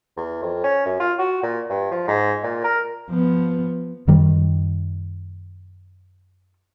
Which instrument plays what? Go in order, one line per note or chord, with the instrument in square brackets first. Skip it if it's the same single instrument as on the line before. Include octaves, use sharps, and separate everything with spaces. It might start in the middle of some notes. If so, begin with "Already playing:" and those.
[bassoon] E2
F2
C#4
F#2
F4
F#4
A#2
G2
F3
G#2
A#2
A#4
[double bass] F3 B3
[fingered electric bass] F#2 D#3 G3